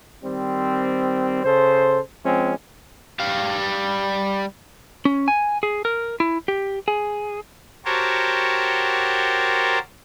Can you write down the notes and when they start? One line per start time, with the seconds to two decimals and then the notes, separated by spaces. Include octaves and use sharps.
0.23 D#3 G3 C4
1.44 C#3 A4 C5
2.24 F3 G#3 C4 C#4
3.20 G3 F5
5.05 C#4
5.28 G#5
5.63 G#4
5.85 A#4
6.20 E4
6.48 G4
6.88 G#4
7.85 F#4 G4 A#4 C5 C#5 A5